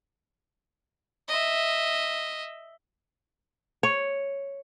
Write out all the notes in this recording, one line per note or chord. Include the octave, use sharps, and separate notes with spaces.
D#5 E5
C#5